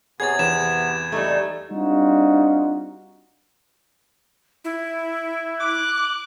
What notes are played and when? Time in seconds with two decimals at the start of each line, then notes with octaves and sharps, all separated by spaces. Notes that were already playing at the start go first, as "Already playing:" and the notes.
0.20 C3 B3 G#4 C#5 G#6 A6
0.39 E2 E7
1.12 G3 A3 D#4
1.71 G3 C4 D4 D#4 F4 F#4
4.64 E4
5.60 D6 F#6